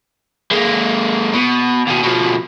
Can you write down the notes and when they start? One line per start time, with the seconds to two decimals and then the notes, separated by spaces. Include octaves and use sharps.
0.51 G#3 A#3
1.34 B2
1.87 D#2 B2
2.03 B2 F3